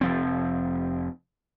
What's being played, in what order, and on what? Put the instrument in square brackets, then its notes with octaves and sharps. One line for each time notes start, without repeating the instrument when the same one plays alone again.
[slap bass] F1 F3 C4